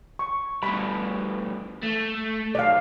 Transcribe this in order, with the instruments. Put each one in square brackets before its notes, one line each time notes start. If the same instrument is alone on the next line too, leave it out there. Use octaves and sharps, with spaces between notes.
[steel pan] C#6
[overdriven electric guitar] G2 B2 [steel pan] B5
[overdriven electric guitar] A3
[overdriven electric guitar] B1 [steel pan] D5 F5